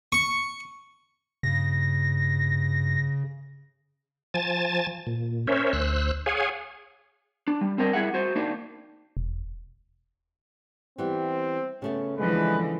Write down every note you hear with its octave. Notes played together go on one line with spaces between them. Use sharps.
C#6
G2 C#3 A#6
F3 G#5 A5 A6
A#2
C#4 A#4 C5 C#5 E5
D2 C5 E6 F#6
G#4 C#5 F5 F#5 G#5
D4
G3
C4 D4 A#4 C5 D#5
G3 E4 G#4 E5 F#5
F#4 C5
A#3 D4 D#4
E1
E3 G3 B3 C4
C#3 A3 B3 C#4
D3 E3 F3 G#3 G#4 B4